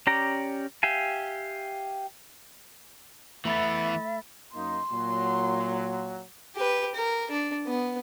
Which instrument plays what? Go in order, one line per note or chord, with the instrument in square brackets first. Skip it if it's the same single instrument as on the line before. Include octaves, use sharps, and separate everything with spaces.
[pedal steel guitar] C#4 G4 D5 A#5
G4 E5 F5 G#5
[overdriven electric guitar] E3 B3 [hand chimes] A3 B5 A6 [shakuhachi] E5
[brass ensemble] F#2 A#3 D#4 [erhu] C6
[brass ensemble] A#2 F#3
[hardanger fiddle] G4 B4
A#4
D4
B3